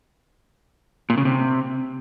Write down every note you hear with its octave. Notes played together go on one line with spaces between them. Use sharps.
A#2
C#3
C3